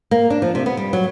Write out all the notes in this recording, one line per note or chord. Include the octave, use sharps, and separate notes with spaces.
A#3
D4
F3
C3
B3
G3
F#3